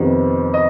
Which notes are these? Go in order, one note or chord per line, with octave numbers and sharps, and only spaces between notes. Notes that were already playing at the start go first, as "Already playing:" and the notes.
Already playing: F2 C3 D#3 B3
D#5